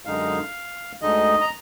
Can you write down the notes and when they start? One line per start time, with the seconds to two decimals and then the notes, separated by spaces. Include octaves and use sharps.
0.05 F#2 D3 G#3 D#4 F5
1.02 D2 D3 G#3 D#4 D#5
1.41 A#5